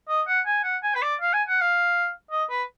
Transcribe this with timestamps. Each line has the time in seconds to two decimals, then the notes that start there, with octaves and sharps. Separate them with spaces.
0.09 D#5
0.28 F#5
0.46 G#5
0.64 F#5
0.83 G#5
0.95 B4
1.02 D5
1.21 F5
1.33 G#5
1.49 F#5
1.61 F5
2.31 D#5
2.50 B4